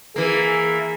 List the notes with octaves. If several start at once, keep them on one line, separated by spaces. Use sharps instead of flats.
E3 A#3 G#4